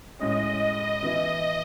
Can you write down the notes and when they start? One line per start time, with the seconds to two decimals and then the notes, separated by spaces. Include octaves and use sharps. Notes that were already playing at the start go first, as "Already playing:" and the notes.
0.19 A2 G#3 C#4 D#5
0.61 D#5
1.03 E3 B3 E4